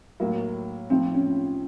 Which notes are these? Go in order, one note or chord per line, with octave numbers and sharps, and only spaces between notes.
A2 F#3 A#3
A2 F3 C4
C#4